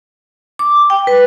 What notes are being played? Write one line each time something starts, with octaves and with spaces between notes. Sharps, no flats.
D6
G5
B4